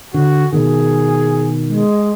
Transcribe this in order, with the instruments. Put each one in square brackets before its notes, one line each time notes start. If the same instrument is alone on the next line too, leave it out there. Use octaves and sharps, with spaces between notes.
[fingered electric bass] D3 [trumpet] F#4
[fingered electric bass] B2 D#3 [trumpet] G#4
[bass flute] G#3